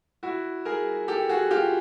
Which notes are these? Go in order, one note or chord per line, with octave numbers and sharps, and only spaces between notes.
E4 F#4
G#4 A#4
G4 A4
F#4 G#4
F4 G4